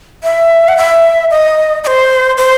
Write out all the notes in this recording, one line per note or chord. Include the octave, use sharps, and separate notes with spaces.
E5
F#5
E5
D#5
D#5
C5
C5